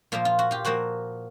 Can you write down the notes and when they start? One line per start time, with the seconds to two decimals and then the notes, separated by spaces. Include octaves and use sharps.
0.12 A#2 F3 A#3 F4
0.25 F4
0.39 F#4
0.51 F4 G4
0.64 A#2 F3 A#3 F#4